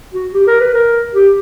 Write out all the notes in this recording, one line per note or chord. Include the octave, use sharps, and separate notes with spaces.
F#4
G4
A#4
B4
A#4
G4